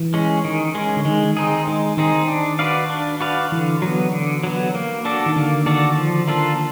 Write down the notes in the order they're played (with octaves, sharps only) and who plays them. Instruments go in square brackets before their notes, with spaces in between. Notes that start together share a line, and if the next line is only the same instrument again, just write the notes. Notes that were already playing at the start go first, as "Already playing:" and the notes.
Already playing: [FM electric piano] E3
[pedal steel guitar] G#3 C#4
D#3
G#3 C#4
[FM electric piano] D3
[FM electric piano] D#3 [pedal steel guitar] G#3
[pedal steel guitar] C4 D#4 G#4
[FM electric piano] D#3 [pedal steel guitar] G#3
[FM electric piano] D#3 [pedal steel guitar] C4 D#4 G#4
[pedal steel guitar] D4
F#4 B4 D5 F5
D4
F#4 B4 D5 F5
[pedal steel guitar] D3 [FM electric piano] E3
[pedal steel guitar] F#3
B3
D3
F#3 B3
A#3
D4 F#4 A4 D5
[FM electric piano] D#3
[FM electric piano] D3 [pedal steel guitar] A#3
[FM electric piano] D#3 [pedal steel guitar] D4 F#4 A4 D5
[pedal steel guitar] F3
A#3 D4 F4 A4